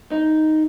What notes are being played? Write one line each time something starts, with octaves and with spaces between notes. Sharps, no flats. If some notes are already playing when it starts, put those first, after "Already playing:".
D#4